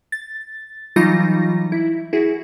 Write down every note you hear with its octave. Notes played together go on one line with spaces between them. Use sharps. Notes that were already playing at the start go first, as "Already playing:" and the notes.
A6
E3 F#3 G3 D#4 F4 A#6
E4
E4 F#4 G#4